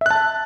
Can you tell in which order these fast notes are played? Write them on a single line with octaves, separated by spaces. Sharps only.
E5 F#6 A5